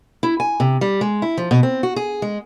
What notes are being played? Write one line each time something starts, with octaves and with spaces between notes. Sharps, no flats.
E4
G#5
C3
G3
G#3
E4
F3
B2
C4
F#4
G#4
G#3